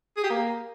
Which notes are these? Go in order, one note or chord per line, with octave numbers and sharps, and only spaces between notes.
G#4
G4
A#3